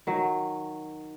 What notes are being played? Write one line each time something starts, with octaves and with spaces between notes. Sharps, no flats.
D#3 F#3